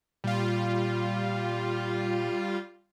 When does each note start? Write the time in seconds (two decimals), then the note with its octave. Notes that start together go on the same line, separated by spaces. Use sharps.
0.24 A#2 G3 F4